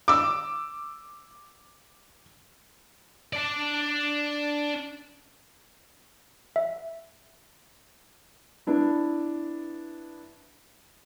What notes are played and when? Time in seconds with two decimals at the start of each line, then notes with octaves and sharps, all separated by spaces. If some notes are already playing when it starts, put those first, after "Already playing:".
0.08 D6 E6
3.33 D4 D5
6.56 E5
8.67 B3 D4 E4